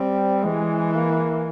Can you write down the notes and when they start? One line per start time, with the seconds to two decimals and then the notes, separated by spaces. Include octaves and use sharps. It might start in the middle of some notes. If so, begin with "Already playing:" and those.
Already playing: G3 C4
0.44 E3 G#3
0.95 A#3